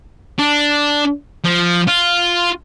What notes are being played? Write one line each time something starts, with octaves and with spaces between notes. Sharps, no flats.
D4
F3
F4